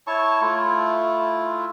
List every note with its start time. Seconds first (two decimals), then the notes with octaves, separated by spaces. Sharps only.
0.07 E4 C#5 A5 C#6
0.41 A3 E4 F4